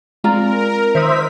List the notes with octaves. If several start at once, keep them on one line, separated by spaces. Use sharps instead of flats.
G#3 C4 F4 A#4 D5 A#5
D#3 C5 E5 D#6 B6